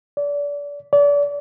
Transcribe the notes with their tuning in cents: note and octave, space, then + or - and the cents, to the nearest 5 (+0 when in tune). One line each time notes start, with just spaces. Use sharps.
D5 -30
D5 -35